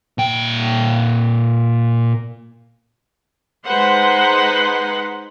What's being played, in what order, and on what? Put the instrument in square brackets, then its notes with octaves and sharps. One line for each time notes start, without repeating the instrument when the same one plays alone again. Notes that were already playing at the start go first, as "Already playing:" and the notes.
[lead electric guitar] A#2 G5
[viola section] G#3 D#4 B4 C5 F#5